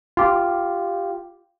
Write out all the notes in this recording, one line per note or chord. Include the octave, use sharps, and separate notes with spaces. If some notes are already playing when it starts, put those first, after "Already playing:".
F4 G4